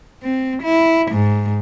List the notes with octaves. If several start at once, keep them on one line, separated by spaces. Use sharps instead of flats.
C4
E4
G#2